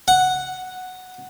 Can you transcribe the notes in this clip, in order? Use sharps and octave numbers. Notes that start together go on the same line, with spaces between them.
F#5